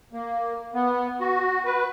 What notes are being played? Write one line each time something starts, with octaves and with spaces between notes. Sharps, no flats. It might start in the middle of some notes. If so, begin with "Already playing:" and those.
A#3
B3
F#4
B4